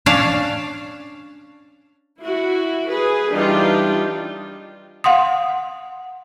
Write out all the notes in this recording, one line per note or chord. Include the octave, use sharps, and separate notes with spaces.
C#4 D4 F5 A5
E4 F#4
G#4 B4
E3 G3 D4 D#4 F4 G4
F5 F#5 C6 D#6